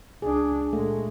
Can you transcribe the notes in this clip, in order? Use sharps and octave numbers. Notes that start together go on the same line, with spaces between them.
C#2 D4 G#4
A#2 G#3 A3